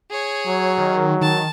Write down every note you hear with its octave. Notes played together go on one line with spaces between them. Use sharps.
G#4 C#5
F#3
D#3
D#3 A5